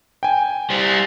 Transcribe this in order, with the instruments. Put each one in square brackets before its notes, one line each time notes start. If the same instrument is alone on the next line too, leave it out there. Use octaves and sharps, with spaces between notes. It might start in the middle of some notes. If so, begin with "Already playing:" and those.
[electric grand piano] G5 G#5
[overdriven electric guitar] G3 C5